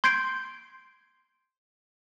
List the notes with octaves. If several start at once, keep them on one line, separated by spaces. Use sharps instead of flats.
C6 G6 G#6 C7 D7